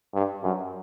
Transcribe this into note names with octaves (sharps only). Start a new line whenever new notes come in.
G2
F#2